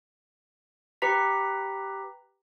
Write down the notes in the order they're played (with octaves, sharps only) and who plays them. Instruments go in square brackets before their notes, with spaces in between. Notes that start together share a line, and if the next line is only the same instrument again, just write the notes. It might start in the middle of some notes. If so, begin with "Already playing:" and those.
[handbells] G4 B4 A#5 B6